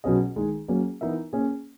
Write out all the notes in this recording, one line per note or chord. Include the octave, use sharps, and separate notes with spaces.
B2 F#3 C#4 G#4 D#5
D#3 G#3 D#4 G#4
F#3 A#3 C#4 G#4
E3 B3 D#4 A#4 E5
A#3 C#4 G#4